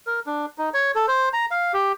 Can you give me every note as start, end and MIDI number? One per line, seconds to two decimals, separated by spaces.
0.07 0.20 70
0.27 0.46 62
0.58 0.69 63
0.74 0.91 73
0.95 1.06 69
1.08 1.29 72
1.33 1.46 82
1.51 1.72 77
1.74 1.92 67